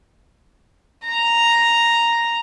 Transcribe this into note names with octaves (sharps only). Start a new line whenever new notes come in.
A#5